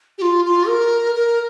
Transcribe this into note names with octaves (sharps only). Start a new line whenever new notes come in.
G4
F4
F4
A#4
A#4